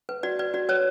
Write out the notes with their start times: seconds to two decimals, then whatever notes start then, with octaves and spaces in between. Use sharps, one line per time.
0.09 B4
0.23 F#4 D5
0.39 B4 D5
0.54 F#4 D5
0.69 B4 C#5